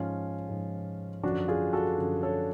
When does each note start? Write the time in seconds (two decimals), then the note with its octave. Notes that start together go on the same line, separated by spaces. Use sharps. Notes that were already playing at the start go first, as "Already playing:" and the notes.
Already playing: G#2 F3 C#4 F4
0.49 G#2 F3
1.23 F#2 D3 F3 D4 F#4
1.48 F4 G#4
1.73 F#4 A4
1.98 F#2 D3 F3
2.23 A4 C#5